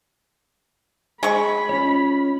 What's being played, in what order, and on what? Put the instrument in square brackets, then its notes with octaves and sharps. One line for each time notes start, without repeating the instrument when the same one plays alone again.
[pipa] G#3 C#6 [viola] B5
[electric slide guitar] C#4 F4 C#5